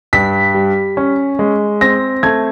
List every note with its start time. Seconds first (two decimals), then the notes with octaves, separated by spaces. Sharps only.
0.13 G2 B6
0.54 G3
0.97 C#4
1.39 G#3
1.81 C4 A#6
2.23 A3 G#6